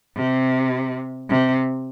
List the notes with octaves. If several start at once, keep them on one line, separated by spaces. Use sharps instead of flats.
C3
C3